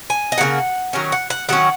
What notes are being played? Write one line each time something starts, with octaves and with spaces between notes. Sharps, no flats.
G#5
D#5
C#3 F#3 A#3 F#5
D#3 F#3 C#4
F#5
F#5
D#3 F#3 C#4 F#5